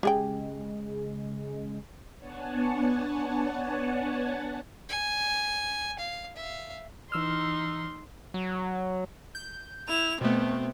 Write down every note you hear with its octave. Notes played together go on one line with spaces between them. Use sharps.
C#3 G#3 G4 G#4 G5
B3 D4 C#5 F#5 G#5 A5
G#5
F5
E5 F5
E3 D#4 C6 E6 F6
F#3
G6
E4 F7
B2 A3 B3 C4